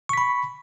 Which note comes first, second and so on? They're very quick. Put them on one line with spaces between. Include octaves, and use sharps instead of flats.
C#6 B6 B5